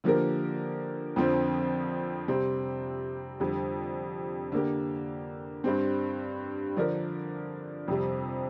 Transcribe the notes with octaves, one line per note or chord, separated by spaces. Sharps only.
D3 F3 A#3 G4 A#4
F2 D3 F3 C4
C3 G3 C4
F2 D3 G3
D3 A#3 G4
G2 G3 C4
D3 F3 D4 A#4
F2 C3 G3